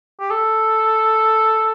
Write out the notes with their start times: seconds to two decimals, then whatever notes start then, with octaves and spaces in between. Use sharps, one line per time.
0.20 G4
0.30 A4